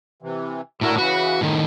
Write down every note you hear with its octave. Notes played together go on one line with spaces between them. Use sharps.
C3 E3
A2 D3 E4 F#4 A#4
C#3 E3 F#4 B4
A2 D#3